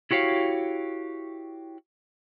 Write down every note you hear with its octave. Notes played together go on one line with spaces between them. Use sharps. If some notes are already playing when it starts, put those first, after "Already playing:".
E4 F#4 G4 C#5 F5